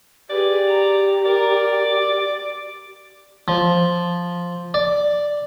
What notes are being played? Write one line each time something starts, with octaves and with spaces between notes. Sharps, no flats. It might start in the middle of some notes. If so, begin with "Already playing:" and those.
G4 G#4 B4 D5
A#5
A#4 D5 A#5
D6
F3
D5